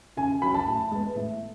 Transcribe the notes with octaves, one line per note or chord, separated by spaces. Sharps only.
C#3 G#5
F#3 C#4 B5
A5
A2
G#3 B3
A2